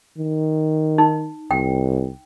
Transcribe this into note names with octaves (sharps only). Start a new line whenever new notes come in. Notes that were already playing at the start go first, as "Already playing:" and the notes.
D#3
D#4
C2 G5